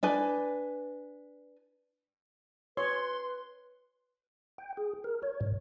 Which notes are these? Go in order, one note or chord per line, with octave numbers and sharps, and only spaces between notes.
D4 B4 G#5
B4 C#5 C6
G5
G#4
A#4
C#5
G#2